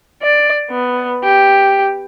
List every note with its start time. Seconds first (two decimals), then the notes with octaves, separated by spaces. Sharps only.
0.22 D5
0.70 B3
1.24 G4